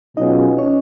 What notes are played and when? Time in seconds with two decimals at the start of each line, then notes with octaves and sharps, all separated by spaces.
0.17 B2 F#3 C#4 D#4 F4 G#4 D#5
0.58 C#4 C#5